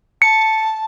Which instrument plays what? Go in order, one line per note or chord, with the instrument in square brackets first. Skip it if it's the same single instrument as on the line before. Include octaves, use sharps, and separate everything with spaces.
[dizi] A5 [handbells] C#7